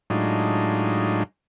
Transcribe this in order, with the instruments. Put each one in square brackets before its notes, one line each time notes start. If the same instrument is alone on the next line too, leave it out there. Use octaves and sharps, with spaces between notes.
[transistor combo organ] A2 F#3 G#3 D4 D#4 F4